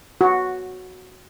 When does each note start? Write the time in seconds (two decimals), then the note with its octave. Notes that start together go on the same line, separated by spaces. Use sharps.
0.21 F#4